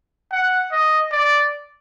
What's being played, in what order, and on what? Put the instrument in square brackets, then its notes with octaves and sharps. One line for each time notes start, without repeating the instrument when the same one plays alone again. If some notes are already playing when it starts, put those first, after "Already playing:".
[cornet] F#5
D#5
D5